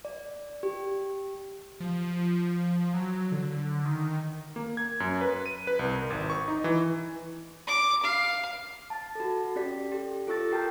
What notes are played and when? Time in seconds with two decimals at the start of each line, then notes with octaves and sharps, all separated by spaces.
0.05 D5
0.63 G4
1.80 F3
2.94 F#3
3.32 D3
3.85 D#3
4.56 A#3
4.77 G#6
5.00 F#2
5.21 B4
5.46 D#7
5.67 B4
5.79 C2
5.94 A#4
6.10 G#1
6.30 C#6
6.48 D#4
6.64 E3
7.67 D6
8.03 F5
8.90 A5 A6
9.15 F#4 A4
9.56 C#4 G4 D5 B6
9.92 G4 A4
10.27 F4 A4 C#6 E6 A6
10.51 G4 A#4 G5 A5 F6 G6